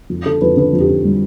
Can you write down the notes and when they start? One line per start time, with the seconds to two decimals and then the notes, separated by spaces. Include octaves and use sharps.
0.10 F2
0.25 D3 A4
0.41 F2 B4
0.57 D3 B4
0.73 F2
0.80 G4
0.89 D3
1.04 G3